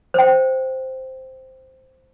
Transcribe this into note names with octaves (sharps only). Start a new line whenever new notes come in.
C5 G5